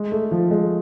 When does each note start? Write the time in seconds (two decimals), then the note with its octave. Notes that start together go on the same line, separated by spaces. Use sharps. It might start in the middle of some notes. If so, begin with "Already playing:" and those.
Already playing: G#3
0.12 A3
0.31 F3
0.51 G#3